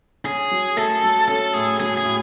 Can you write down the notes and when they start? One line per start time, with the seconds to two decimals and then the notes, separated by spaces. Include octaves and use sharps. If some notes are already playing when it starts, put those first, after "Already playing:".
0.25 C#4 G#4
0.51 F#3
0.77 A3 A4
1.03 F#3
1.28 C#4 A4
1.54 A2 G#4
1.80 F#3 G#4
1.97 G#4
2.05 A2